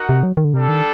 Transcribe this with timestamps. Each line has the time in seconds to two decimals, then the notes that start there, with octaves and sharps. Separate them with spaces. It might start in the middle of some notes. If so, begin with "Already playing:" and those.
Already playing: D#4 F#4 A#4 F#5
0.09 C3
0.23 F#3
0.37 D#3
0.45 D3
0.54 C3 G3 D4 A4
0.68 D#3